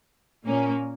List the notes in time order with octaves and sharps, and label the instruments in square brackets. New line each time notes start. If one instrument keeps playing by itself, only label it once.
[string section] A#2 A#3 C#4